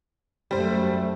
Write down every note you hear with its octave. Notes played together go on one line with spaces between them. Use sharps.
F#2 G3 A3 C5